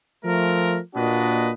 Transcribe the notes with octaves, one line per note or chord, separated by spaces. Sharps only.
F3 A3 A#4
A#2 A#3 D4 F#4 B4 D#5